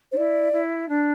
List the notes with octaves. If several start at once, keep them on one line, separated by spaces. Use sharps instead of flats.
D4 C5
E4 D5
E4
D4